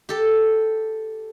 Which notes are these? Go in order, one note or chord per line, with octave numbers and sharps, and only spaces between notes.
G4 A4